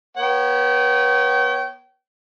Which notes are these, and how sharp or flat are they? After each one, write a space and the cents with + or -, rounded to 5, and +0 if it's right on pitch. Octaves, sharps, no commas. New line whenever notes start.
B3 -35 C#5 -10 G5 -35